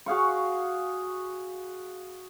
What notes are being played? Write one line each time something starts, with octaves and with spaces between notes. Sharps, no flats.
F#4 G#4 F5 C#6